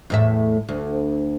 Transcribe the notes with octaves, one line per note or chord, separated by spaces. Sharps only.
E2 A2 E5
D2